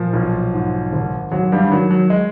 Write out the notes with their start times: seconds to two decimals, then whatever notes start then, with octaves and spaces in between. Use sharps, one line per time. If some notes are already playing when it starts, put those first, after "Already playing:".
Already playing: A#2 F3
0.13 B1
0.53 G#2
0.93 G#1
1.32 G#1 F#3
1.52 G2 G3
1.71 D#3 F#3
1.91 F#3
2.10 G#3